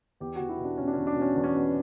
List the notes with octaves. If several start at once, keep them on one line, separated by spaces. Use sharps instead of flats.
E2 G4
E2 F#4
E4
B2
D4
B2 C#4
D4
E2 C#4
D4
B2
C#4
E2
C#4
B2